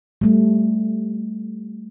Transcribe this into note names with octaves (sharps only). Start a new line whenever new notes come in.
G3 A3